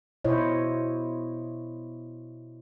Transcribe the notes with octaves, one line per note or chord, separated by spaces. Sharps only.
B2 E4 C5 C#5 D#5